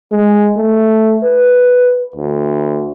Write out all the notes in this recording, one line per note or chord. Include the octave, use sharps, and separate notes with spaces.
G#3
A3
B4
D2